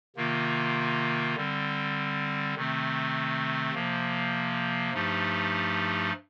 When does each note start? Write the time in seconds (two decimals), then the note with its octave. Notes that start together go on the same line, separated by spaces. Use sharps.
0.16 C3 D#3 A#3 F4
1.36 D3 G3 C4
2.55 C3 D#3 A3 C4
3.74 C3 F3 A#3
4.93 G2 F3 A3 D#4 G4